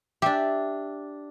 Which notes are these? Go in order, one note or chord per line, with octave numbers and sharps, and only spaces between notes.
D4 G4 E5